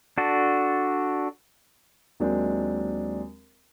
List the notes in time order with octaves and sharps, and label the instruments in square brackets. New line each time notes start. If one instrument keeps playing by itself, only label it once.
[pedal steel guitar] D4 F#4 A4
[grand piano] D#2 F#3 G#3 C4 D4